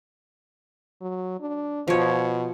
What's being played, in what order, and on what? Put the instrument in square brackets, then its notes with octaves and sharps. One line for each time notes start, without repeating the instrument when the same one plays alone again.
[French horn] F#3
D4
[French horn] B2 [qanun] F3 C#5